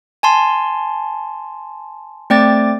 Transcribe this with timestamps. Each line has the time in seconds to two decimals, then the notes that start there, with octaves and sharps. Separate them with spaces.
0.23 G#5 A5 C6
2.30 A3 C4 D5 G5 D6 A6